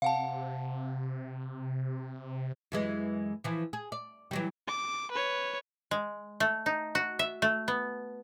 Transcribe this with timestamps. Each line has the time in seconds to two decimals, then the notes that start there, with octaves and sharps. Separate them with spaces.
0.02 C3 F5 F#5 A5
2.72 F#2 E3 G#3
3.44 E3 F3
3.73 G#4
3.92 D5
4.31 E3 F#3 G3
4.68 D6
5.11 B4 C#5
5.91 G#3
6.40 A3
6.66 D#4
6.95 F#4
7.19 E5
7.42 A3
7.68 B3